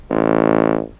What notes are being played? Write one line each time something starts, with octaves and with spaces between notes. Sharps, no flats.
A1